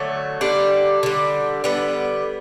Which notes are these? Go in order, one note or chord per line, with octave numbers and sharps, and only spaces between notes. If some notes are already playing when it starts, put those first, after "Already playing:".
Already playing: D3 F#3 A3
D3 G3 D4
D3 G3
D3 G3 B3